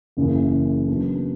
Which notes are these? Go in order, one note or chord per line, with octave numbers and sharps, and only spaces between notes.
F#1 F#2 C#3 E3
C#3 F#3 B3 D4